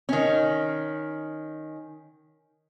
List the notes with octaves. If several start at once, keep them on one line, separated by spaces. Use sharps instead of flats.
D#3 C#4